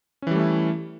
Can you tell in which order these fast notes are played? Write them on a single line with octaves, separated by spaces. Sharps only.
C#4 E3 G3 A3 E4